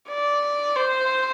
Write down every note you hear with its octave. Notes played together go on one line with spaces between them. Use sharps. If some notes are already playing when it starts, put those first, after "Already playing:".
D5
C5